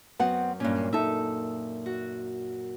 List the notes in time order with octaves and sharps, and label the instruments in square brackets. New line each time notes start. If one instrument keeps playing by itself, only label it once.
[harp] F#2 [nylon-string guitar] B3 C4 F#5
[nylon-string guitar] G2 C#4 [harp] A#2
[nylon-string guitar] D#4 A4 [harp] E5
[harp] F#4